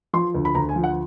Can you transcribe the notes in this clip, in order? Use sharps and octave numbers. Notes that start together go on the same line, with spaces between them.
F3 C6
D2
B5
D2 A#5
G#5
F3
F#5